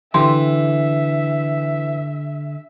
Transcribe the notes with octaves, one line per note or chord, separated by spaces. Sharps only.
D3 E3 G4 E5 G5 C6